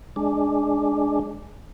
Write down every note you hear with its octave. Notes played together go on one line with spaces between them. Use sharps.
G#3 D4